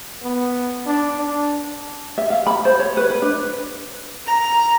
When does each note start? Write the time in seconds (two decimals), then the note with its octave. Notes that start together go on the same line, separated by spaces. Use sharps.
0.23 B3
0.87 D4
1.18 D4
2.18 E5
2.30 F5
2.47 B5
2.65 C5
2.79 C#5
2.97 B4
3.10 B4
3.22 D4
4.26 A#5